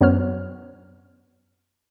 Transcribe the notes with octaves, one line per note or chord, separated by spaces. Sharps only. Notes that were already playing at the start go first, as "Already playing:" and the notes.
F#2 F#3 B3 C5 C#5 F6